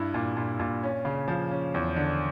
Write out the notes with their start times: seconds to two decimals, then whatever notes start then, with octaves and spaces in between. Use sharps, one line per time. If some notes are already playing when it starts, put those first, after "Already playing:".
Already playing: G2 E4
0.14 A#2
0.37 A#2
0.60 A#2
0.83 C#4
1.05 C#3
1.28 F3
1.51 C#4
1.74 E2
1.96 D3